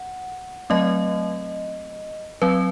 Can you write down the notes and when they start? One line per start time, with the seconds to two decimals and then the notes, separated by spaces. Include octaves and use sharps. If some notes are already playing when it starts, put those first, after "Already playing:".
Already playing: F#5
0.70 F#3 A3 C4 D#5
2.42 F#3 C4 B4